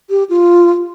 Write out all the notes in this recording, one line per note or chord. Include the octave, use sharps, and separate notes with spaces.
G4
F4